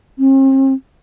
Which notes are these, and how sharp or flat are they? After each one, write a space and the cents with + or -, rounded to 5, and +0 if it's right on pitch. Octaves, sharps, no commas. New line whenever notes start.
C4 +45